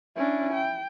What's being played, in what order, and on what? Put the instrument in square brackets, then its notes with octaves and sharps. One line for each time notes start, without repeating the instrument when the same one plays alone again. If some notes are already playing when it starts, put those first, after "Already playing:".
[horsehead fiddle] C#4 D4 [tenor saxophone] E4
[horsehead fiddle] G5